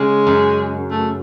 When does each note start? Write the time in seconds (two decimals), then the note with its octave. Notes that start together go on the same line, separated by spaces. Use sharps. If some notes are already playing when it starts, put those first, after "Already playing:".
Already playing: C#3 G#3
0.27 F#2
0.90 A3